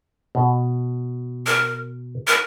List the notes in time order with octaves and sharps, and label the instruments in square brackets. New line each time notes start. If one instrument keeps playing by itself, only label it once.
[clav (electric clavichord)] B2
[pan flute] A#4
A#4